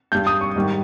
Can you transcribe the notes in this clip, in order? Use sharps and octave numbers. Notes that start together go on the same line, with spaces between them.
G2 G3 G6
D#6
C#6
G#2 D#3 G3